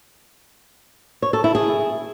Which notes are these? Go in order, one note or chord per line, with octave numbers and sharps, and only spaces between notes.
C#5
A4
E4
G#4